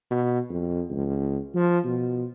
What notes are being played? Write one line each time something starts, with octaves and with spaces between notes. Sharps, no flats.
B2
F2
C#2
F3
B2